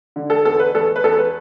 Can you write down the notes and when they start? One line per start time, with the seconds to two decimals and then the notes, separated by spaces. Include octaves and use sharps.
0.16 D3
0.30 A4
0.45 E2 A4
0.60 B4
0.75 E2 A4
0.96 B4
1.04 E2 A4
1.18 B4